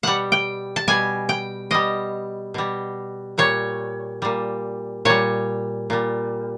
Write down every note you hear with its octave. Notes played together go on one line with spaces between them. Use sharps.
B2 G3 F#5
G5
A5
B2 G3 G#5
G5
B2 G3 D#5
B2 G3
A#2 G3 C#5
A#2 G3
A#2 G3 C#5
A#2 G3